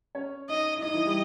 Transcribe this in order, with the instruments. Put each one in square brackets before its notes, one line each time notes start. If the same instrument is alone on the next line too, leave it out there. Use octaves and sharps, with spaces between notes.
[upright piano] C#4 C#5
[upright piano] D#4 [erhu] D#5
[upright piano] E4
[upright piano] D#4 [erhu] D#5
[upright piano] E3 E4
G3 G4